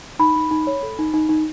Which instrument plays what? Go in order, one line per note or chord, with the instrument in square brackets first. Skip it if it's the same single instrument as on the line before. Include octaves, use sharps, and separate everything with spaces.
[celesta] D#4 B5
D#4
D#4
C#5
A4
D#4
D#4
D#4